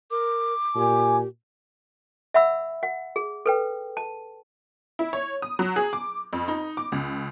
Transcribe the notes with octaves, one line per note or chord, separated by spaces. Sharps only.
A#4 D6
A#2 G4 G#5
E5 F#5 B5 E6
F#5
G#4
A4 B4 G5
A5
E4
C#5
D#6
F#3
G#4
D6
F2
D#4
D6
C#2